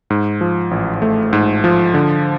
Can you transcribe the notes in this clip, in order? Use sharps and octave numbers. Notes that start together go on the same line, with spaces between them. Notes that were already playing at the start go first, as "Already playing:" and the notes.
G#2
F3
A1
A3
G#2
F3
D3